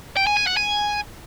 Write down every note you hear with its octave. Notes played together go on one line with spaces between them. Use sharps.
G5
G#5
G#5
F#5
G#5